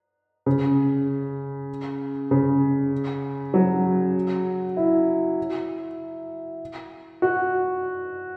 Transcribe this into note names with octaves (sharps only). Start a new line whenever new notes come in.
C#3
C#3
F#3
E4
F#4